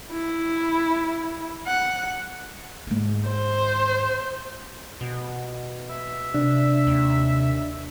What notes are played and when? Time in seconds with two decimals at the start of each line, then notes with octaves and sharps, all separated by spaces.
0.12 E4
1.67 F#5
2.87 G#2 D#3
3.29 C5
5.01 B2
5.90 E5
6.34 C3 D4
6.87 D#2